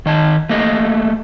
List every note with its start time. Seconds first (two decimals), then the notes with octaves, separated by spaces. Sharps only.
0.06 D#3 D#5 A5
0.49 A3 A#3 G4 D#5